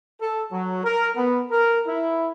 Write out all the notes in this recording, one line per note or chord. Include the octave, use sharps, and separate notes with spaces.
A4
F#3
A#4
B3
A#4
E4